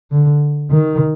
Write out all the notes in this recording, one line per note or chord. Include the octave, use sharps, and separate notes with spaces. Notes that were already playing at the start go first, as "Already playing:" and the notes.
D3
D#3